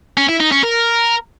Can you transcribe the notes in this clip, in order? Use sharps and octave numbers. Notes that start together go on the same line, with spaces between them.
C#4
E4
D#4
C#4
A#4